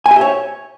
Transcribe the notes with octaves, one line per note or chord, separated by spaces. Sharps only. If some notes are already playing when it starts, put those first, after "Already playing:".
G#5
G4
E5
C#5